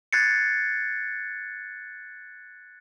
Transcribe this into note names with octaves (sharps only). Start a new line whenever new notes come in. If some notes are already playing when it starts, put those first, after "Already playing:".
F#6 G#6 A6 C7 C#7